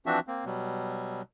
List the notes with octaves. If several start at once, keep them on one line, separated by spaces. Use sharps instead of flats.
E3 F3 C4 D4 F#4 E5
A#3 C4
B2 F#3 G3